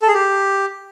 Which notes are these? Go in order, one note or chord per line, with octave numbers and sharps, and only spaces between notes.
A4
G#4
G4